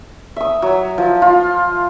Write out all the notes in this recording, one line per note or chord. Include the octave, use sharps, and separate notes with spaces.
E5 D#6
F#3
F3
F4